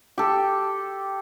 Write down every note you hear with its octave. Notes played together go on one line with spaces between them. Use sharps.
G4 A4